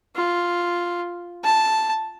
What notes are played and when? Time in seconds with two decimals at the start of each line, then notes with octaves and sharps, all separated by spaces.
0.16 F4
1.44 A5